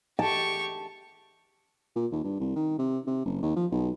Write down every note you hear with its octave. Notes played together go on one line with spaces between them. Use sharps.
G4 A5 C#6
A#2
D#2
G2
C2
D#3
C3
C3
F#1
D#2
F3
B1